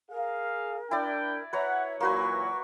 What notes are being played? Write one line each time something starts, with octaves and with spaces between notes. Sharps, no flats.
G#4 A#4 F5
D4 E4 D5 G5
B4 C#5 E5 F#5 A#5
A#2 E3 F#3 A#3 F#4 B4 C#6